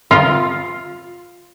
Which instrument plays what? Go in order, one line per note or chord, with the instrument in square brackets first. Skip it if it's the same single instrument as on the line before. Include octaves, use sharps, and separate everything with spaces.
[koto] F4